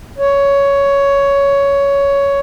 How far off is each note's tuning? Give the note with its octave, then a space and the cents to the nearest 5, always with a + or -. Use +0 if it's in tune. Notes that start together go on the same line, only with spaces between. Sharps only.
C#5 +10